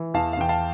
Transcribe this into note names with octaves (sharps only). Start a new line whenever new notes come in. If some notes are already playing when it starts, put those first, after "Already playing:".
Already playing: E3
E2 F5 A5
F5
E2 G5
F5 A5